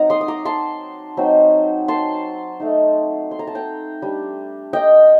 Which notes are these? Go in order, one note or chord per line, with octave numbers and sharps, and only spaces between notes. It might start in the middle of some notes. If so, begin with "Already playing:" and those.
Already playing: F#3 C4 D#4 F#5 A#5
C6 D#6
D#6
A#5 D6
A5 C6
F#3 C4 D#4
A5 C6
A3 D#4
C6
A#5
A5
G5 A#5
G3 D4
D#5 G5